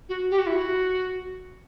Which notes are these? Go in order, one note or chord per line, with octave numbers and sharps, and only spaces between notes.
F#4
G4
F#4
E4
F#4